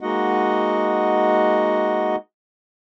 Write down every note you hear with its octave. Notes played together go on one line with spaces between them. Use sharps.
G#3 A#3 D#4 F#4 D#5 F#5